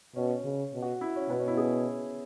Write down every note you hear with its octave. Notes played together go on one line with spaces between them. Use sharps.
B2 C#4
C#3
B2
F#4
E4
C#4
B2 B3
C#4
E4
G#4